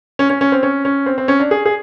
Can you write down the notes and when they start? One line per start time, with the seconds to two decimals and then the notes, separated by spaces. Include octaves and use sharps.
0.19 C#4
0.30 C#4
0.41 C#4
0.52 C4
0.63 C#4
0.85 C#4
1.06 C4
1.18 C4
1.28 C#4
1.40 D4
1.51 G#4
1.66 G#4